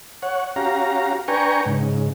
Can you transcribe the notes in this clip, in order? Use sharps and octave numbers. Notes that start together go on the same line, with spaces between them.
C#5 F#5
C#4 F#4 G4 F5 A#5
D4 B4 G5 G#5 A#5 C#6
G#2 C#3